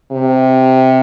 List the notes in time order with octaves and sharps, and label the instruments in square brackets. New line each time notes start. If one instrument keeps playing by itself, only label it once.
[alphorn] C3